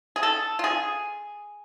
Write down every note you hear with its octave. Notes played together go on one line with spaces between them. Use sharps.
G#4
A4
F4
G#4